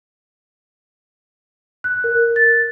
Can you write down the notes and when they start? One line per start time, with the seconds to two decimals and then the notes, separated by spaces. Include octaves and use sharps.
1.84 F#6
2.04 A#4
2.36 A6